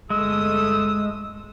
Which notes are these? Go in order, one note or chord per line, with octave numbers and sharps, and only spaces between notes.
G1 G#3 A3 D#6 E6